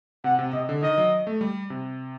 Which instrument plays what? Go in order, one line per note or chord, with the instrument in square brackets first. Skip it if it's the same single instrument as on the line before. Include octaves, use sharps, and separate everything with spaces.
[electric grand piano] C3 [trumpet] F#5
[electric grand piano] C3
[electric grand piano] C3 [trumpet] D#5
[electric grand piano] D3
[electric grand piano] D#3 [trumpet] D#5
[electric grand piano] F#3
A3
G3
C3